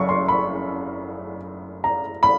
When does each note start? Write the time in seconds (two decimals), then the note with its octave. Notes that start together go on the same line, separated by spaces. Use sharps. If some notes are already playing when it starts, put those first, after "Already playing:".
Already playing: F#1 F#2 C#3 C#6
0.09 C6
0.28 B5
1.84 A#5
2.23 B5